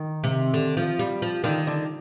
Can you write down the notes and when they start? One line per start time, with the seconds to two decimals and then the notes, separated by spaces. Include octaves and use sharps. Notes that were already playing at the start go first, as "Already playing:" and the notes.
Already playing: D#3
0.24 C3
0.54 D3
0.77 F3
0.99 G3
1.22 F3
1.44 D3 D#3
1.67 D3